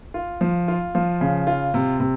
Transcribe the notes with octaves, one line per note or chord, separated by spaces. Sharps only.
F4
F3
F4
F3
C#3
F4
C3
C3